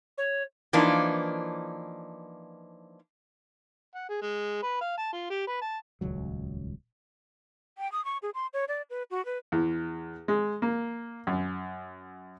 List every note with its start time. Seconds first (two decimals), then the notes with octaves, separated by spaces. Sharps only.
0.18 C#5
0.73 E3 F3 A#3 D4 D#4
3.95 F#5
4.09 G#4
4.22 G#3
4.63 B4
4.81 F5
4.98 A5
5.13 F4
5.30 G4
5.47 B4
5.62 A5
6.01 D#1 C#2 F#3
7.78 G5
7.92 D#6
8.05 C#6
8.22 G#4
8.34 C6
8.53 C#5
8.68 D5
8.90 B4
9.11 F#4
9.25 B4
9.52 E2
10.28 G#3
10.62 A#3
11.27 F#2